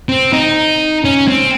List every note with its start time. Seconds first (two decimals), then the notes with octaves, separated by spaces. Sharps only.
0.09 C4
0.33 D#4
1.05 C#4
1.28 C4